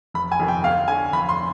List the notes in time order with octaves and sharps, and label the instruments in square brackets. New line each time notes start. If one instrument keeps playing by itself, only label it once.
[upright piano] F1 B5
G#5
F2 C3 D#3
G5
D2 F5
D3 G#5
F1 B5
C6